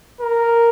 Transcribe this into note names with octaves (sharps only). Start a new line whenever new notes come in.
A#4